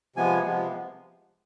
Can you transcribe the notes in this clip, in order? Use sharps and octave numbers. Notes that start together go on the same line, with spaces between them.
C3 F3 G#3 B3 G#5
C3 F3 G#3 B3